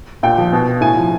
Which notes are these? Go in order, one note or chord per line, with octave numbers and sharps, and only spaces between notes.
A#2 G5
F3
B2
A2 G#5
F3